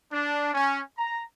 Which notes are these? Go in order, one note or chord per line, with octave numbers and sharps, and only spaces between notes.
D4
C#4
A#5